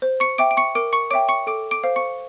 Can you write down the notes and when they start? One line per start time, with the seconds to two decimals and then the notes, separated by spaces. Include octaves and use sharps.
0.02 C5
0.20 C#6 C#7
0.38 E5 G5 D6 D7
0.51 D7
0.57 C#6 C#7
0.75 A#4 D6 D7
0.93 C#6 C#7
1.11 C#5 E5 G5 D6 D7
1.29 C#6 C#7
1.47 A4 D6 D7
1.71 D6 D7
1.83 C5 F5
1.96 C#6 C#7